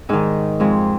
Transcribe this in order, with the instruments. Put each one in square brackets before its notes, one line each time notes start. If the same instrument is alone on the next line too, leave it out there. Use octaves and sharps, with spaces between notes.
[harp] G#2 D#3 D#4
F2 F3 G#3